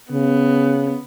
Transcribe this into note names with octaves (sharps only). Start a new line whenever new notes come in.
C#3 B3